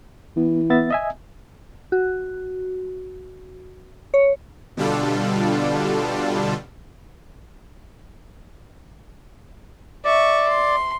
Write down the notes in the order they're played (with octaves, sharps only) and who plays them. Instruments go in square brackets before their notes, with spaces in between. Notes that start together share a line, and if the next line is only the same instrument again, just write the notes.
[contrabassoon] E3 [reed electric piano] B3
[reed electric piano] B3 E5 A6
D#5 E5 G#5
[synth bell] F#4
C#5
[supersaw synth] B2 D3 G3 D4 F4 A4
[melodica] D5 [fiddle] E5 C#6
[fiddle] C6